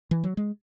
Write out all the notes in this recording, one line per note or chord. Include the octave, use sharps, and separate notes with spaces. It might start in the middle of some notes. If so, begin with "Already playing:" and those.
E3
F#3
G#3